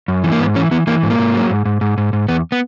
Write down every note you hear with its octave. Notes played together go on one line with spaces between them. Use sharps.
F#2
E3
A#3
G#2 B3
E3 C#4
E3 B3
E3 A#3
G#2
A#3
G#2
F#3
G#2
G#2
G#2
G#2
G#2
E2 B3
B3